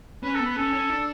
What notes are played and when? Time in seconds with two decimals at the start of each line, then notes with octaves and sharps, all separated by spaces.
0.23 C#4 B4
0.35 A4
0.39 B3
0.45 B4
0.56 C#4 A4
0.73 C#4
0.90 D4